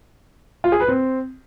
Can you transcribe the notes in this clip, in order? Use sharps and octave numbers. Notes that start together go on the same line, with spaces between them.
F4
G#4
B4
C4